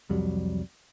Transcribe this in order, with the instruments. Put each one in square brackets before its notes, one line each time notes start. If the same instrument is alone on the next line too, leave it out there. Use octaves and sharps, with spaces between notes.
[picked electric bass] C2 F2 F#3 G3